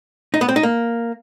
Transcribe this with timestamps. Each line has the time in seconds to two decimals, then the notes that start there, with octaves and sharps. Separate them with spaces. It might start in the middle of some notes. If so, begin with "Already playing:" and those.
0.34 D#4
0.41 B3
0.49 C4
0.56 D#4
0.63 A#3